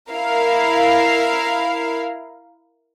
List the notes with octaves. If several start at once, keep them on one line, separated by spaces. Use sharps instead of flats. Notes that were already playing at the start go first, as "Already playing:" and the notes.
E4 A#4 F5